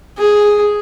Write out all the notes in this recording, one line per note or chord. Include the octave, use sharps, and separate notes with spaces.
G#4